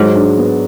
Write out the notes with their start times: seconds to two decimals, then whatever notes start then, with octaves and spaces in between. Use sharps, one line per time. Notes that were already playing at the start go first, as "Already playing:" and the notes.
Already playing: G#2 F#3
0.15 D4
0.38 B3